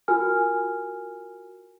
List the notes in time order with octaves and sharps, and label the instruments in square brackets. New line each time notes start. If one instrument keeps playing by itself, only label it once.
[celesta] F4 F#4 A#4 G#5 F6